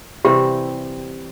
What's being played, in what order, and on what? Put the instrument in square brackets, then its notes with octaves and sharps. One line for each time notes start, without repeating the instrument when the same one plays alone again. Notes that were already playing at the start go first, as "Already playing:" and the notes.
[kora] C3 E3 G3 C4 [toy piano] G4